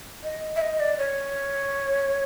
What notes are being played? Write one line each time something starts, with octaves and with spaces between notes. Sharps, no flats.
D#5
E5
D#5
D5
C#5